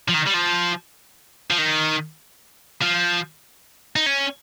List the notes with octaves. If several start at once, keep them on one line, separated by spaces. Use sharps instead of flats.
F3
D#3
G3
F3
F3
D#3
F3
D#4
C#4